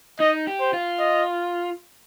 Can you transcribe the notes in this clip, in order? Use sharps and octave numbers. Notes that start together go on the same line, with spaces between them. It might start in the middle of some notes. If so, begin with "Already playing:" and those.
D#4 D#5
G4
C5
F4
D#5